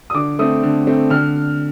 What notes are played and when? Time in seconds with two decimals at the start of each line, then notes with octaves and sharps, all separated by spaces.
0.10 D#6
0.14 D3 D6
0.39 A3 C4 D#6
0.63 D3
0.87 A3 C4
1.10 D3 F6